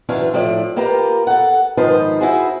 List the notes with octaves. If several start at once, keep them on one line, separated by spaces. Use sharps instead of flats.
F#2 E3 D4 F4 C#5
A2 F3 A3 D5
A#3 F4 G4 A#4 B4
A4 F#5
G#2 D#3 F3 B4 C5 A5
E4 F#4 G#4 C5